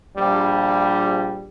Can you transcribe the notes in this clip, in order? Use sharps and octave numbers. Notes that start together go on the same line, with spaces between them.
A#1 G3